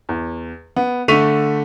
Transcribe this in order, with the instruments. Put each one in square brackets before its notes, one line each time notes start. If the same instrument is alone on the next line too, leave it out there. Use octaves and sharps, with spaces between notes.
[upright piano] E2
B3
D3 A3 C#6 B6 D#7 F7